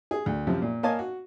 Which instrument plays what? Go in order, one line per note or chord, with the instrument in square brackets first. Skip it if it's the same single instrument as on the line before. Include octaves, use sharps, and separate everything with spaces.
[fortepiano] G#4
D2
F#2 C3 F3
A#2
A#3 C#5 D#5 F5 G#5 A5
F#4